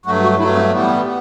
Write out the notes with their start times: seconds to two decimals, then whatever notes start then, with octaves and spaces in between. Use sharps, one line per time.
0.06 G2 F#3 A3 F#4
0.23 F#4
0.39 G2 F#3 A3 E4
0.55 C4
0.72 A2 E3 G3 B3
1.05 B3